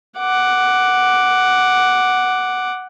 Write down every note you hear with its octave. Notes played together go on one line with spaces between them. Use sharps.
F#5 D6